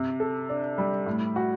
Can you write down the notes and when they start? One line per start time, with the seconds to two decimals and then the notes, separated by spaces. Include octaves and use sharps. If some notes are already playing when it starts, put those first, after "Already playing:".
Already playing: C3
0.20 A4
0.49 D4
0.78 G3
1.06 A2
1.36 F#4